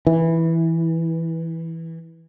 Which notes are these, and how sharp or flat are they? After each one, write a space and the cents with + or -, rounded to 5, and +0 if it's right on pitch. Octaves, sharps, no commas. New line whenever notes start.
E3 -5